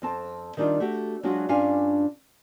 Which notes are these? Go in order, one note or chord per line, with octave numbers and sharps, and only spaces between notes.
F2 C4 A5
D#3 G3 D4 D#4 F4
A3 F#4 G4
F#3 G#3 D4 F4 F#4
G2 C#4 D4 F4 F5 G#5